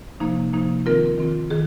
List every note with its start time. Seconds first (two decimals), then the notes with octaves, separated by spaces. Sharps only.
0.20 C3 F3 A#3 D#4
0.53 C3 F3 A#3 D#4
0.86 D#3 C4 F4 A#4
1.18 D#3 C4 F4
1.50 D#3 G#4